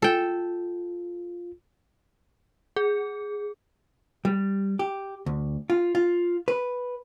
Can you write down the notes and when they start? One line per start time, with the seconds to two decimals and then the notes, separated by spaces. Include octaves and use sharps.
0.02 F4 A4 G5
2.76 G#4
4.25 G3
4.79 G4
5.26 D2
5.70 F4
5.95 F4
6.48 B4